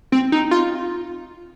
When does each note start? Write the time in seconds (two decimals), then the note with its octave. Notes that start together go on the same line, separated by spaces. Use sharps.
0.12 C4
0.32 D#4
0.51 F4